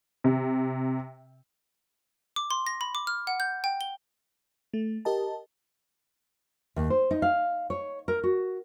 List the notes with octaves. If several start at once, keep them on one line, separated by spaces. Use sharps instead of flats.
C3
D6
C6
A#6
B5
D6
F6
F#5
G6
G5
G7
A3
G4 A#4 D#5 A5
D#2
C5
D#4
F5
C#5
A#4
F#4